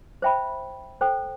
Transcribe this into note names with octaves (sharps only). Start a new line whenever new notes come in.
C5 E5 G5 B5
A4 C5 G5